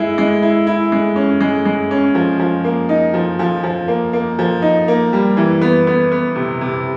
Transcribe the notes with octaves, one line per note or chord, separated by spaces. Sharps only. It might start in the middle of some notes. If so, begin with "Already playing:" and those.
Already playing: G#3 E4
G#3
E4
E4
G#3
C#4
G#3
G#3
C#4
F3
F3
A#3
D#4
F3
F3
F3
A#3
A#3
F3
D#4
A#3
G3
E3
B3
B3
B3
C3
C3